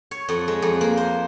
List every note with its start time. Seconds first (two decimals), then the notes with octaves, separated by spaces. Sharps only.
0.11 C#5
0.29 F2
0.48 G#3
0.62 F2
0.81 A#3
0.97 C5